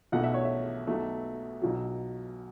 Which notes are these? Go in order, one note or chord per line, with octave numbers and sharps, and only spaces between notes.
B1 B2 A3 F#5
E5
C#5
E5
B1 B2 F#3 A3
B1 B2 F#3